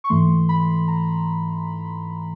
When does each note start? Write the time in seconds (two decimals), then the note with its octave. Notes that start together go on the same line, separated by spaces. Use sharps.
0.04 C#6
0.09 G#2 E3 A3 C6
0.49 B5
0.88 A#5